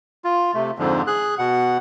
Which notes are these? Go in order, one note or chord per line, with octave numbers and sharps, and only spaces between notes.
F4
C3 A3
F2 G#2 D3 F3
G#4 F#6
B2 F#5